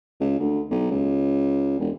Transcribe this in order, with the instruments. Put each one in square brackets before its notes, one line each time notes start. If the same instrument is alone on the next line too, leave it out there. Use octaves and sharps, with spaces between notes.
[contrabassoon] C#2
D2
B1
C#2
E1